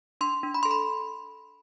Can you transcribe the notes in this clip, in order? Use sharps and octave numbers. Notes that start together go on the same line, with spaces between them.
D4 C6
D4
B5
A4 C6
B5